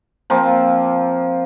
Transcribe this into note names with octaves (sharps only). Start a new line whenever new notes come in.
F3 A#3 C4 F4